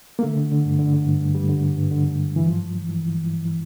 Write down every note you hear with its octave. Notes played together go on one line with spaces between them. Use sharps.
A#3
D3 A3
D3
D3
G2
D3
D3
G2
G2
G2 G3
D3
D3
G2
D3
D3
G2
G2 E3
G2 F3
G2
E3
E3
E3
E3
G2
E3